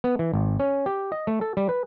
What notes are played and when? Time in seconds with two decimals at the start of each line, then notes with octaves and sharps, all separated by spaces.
0.04 B3
0.19 E3
0.34 G#1
0.60 C#4
0.86 G4
1.12 D#5
1.27 A3
1.41 A4
1.57 G3
1.69 B4